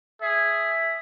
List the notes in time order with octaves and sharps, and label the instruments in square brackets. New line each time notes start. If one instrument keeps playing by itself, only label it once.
[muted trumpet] G#4 [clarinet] E5